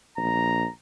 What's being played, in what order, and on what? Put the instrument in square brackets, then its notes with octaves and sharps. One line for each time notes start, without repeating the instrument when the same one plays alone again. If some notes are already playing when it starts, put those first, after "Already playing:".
[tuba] A#1 [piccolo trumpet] A#5